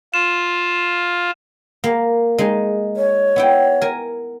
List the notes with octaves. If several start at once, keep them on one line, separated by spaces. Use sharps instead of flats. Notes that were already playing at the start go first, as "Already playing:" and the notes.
F4 E7
A#3
G#3 D#4
C#5
B3 E4 G5
A#4 G#5